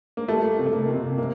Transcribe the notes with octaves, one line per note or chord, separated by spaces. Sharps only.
A#3
G3 A3
C3
A3
A#3
C3
C3 A#3